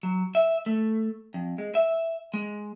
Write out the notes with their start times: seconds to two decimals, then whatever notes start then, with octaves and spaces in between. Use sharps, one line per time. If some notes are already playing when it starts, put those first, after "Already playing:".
0.03 F#3
0.35 E5
0.66 A3
1.34 F2
1.58 G#3
1.75 E5
2.34 G#3